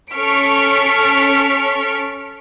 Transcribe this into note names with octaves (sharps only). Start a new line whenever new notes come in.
C#4 A4 C#6 F6 B6 D7